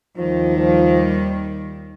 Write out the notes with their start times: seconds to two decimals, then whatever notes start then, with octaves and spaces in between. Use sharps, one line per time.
0.17 D#2 D#3 F3 G3
0.57 F3